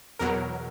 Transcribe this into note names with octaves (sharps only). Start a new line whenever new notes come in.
E2 B2 F#3 A#4